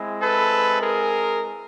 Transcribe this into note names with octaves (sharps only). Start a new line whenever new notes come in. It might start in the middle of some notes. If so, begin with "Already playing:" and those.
Already playing: G#3 C4 E4
A4 B4
G#4 A#4